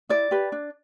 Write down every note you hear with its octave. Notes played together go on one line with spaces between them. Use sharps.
E4 D5
G4 B4
D4